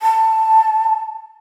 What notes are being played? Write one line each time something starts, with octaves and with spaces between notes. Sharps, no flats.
A5